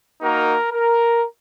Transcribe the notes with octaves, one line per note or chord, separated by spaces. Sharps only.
A#3 D#4 F#4 A#4
A#4